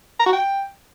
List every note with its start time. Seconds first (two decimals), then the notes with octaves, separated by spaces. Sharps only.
0.20 A#5
0.26 F#4
0.33 G5